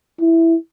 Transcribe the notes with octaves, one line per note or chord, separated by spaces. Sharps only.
E4